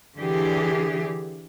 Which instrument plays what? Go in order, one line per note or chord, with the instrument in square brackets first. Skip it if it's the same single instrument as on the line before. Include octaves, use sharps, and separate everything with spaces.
[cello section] D3 E3 G4 G#4